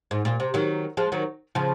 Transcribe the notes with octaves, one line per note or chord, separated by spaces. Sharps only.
G#2
A#2
C3
D#3 F#3
F3 G#3
D#3 F#3
C#3 F3